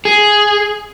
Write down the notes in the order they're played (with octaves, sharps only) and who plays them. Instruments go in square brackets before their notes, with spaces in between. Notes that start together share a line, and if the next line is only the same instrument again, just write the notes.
[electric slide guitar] G#4